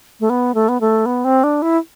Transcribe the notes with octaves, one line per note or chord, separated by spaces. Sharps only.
A3
B3
A3
B3
A3
B3
C4
D4
E4